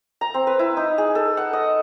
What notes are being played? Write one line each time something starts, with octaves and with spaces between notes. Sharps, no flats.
A#5
C4
B4
E4
D#4
G#4
A4
F#5
D#5